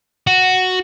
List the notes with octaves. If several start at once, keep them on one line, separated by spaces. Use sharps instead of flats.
F#4